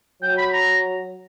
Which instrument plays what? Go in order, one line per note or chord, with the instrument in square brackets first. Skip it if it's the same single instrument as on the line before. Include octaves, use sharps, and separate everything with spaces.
[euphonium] F#3 [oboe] G5
[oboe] B5
A#5